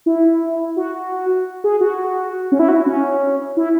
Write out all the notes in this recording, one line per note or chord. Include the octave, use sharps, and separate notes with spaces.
E4
F#4
G#4
F#4
C#4
E4
F#4
C#4
E4